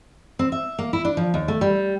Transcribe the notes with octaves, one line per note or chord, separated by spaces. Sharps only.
C4
E5
A#3
E4
D4
F3
D#2
A3
G3